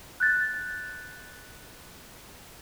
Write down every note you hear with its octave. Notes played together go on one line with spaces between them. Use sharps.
F#6 G6 A6